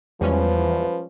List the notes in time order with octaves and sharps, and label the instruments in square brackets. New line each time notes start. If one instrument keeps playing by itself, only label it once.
[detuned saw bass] E2 [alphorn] F3 [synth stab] G3 G#3 C#4 [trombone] B4